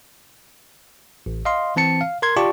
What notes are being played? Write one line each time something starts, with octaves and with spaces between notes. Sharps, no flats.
A1
D#5 F5 C6
E3 C4 A5 C#7
F5
A#4 C6 G#6
F4 G4 D5 A5 C#6